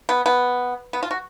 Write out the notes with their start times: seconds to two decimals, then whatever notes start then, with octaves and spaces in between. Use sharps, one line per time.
0.09 B3
0.26 B3
0.93 B3
1.03 F4
1.11 F#4